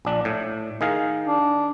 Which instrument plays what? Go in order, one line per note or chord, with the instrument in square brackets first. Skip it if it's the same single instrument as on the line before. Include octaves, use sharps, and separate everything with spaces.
[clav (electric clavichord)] A#1 D4
A2
D#3 G#4 F5
[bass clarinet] D4